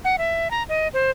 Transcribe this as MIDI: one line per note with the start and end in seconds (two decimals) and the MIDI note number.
0.04 0.16 78
0.18 0.51 76
0.51 0.63 82
0.69 0.88 75
0.94 1.11 72